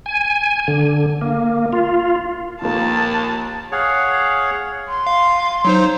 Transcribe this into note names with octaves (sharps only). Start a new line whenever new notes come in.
G#5
D3
A#3
F4
D#2 A#2 F3 A#3 A5
G#4 C#5 F5 F#5
C6
F5
F#3 D#4 C5